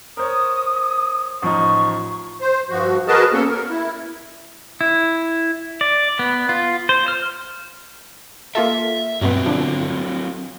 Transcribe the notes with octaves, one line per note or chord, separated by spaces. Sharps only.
A#4 C5 C#5 D#6
A1 F3 D#4 C#6
C5
G2 F3 F#4
F#4 G#4 A#4 B4 D#5 A5
A#3 B3 C#4 A4
A#4
E4
E4
D5
B3
F4
C5
F6
A#3 F4 A4 E5
G2 B2 F#3 B3 C4
D3 F3